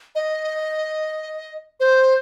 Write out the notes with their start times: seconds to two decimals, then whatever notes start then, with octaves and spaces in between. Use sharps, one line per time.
0.15 D#5
1.80 C5